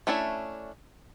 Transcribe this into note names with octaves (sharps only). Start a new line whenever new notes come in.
A3 C#4 D4 E4